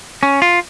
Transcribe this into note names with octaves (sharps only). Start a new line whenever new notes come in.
C#4
F4